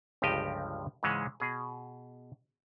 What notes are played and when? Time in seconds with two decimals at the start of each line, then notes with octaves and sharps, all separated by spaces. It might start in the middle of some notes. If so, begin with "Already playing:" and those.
0.22 G1 C#2 G2 F3 G4 D#5
1.03 G#2 C#3 E3 G#3 C#4
1.40 B2 G#4